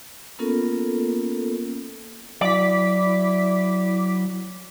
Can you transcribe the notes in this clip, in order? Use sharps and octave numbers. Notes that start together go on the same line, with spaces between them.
A#3 B3 C#4 F4 A4 A#4
F#3 E4 D5 D6 B6